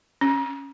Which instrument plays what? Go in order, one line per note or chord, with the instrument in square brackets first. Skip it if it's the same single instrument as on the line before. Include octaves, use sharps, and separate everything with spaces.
[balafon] C#4